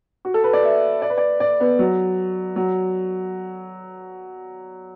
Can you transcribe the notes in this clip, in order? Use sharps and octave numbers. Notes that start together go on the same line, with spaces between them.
F#4
A4
B4
D5
E5
D5
B4
D5
D5
B3
F#3
F#3